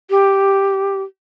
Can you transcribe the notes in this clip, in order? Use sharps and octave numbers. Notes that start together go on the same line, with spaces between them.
G4